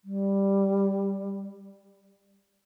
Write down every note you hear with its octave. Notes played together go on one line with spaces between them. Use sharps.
G3